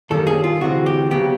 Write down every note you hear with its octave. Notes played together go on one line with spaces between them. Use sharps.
F#2 D#3 G3 A#3 C#4 A4
G#4
F4
D2 C3 E3 G#3 C4 F#4
G4
C#3 F#3 B3 G4